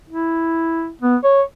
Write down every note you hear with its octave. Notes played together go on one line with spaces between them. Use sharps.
E4
B3
C#5